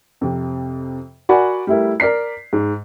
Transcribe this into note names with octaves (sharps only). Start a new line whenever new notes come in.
F2 C3
F#4 A#4 D5 F#5 G#5 B5
G3 A3 E4 A#4
A#4 D5 B6 C7
G#2